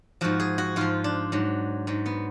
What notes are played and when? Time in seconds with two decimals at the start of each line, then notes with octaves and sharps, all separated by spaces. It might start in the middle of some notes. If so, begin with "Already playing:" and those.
0.21 G#2 F3 F#4
0.40 G#4
0.58 F#4
0.76 G#2 F3 F4
1.04 D4
1.32 G#2 F#3
1.87 G#2 F#3
2.06 B3